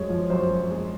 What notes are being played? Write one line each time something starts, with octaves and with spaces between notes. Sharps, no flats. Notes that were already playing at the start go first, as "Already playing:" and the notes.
Already playing: F#2 G#3 C#5
F3
F#2 C5
F#2
G#3